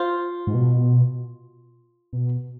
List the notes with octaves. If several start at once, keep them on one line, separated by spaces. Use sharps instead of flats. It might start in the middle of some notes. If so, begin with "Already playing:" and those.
Already playing: F4 C5
G#2
B2
B2